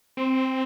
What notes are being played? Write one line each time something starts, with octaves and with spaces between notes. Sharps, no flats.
C4